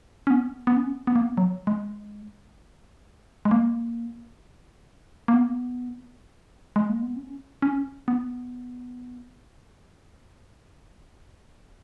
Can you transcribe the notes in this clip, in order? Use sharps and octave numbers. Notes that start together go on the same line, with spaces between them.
C#4
B3
B3
C#4
B3
A#3
B3
F#3
G#3
G#3
A#3
A#3
B3
G#3
A#3
B3
C#4
C#4
B3